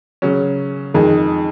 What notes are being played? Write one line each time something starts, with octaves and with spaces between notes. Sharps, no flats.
C#3 F#3 C#4
F2 D#3 G#3 D#4 G#4